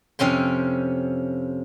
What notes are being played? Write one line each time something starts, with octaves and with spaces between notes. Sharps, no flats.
F2 C3 C#4 G5 C6